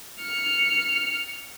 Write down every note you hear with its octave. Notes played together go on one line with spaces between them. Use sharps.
F6 C#7